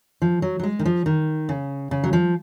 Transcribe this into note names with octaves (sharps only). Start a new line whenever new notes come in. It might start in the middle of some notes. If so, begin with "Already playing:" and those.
F3
F#3
F#3
G#3
D#3
F3
D#3
C#3
C#3
F#3
F3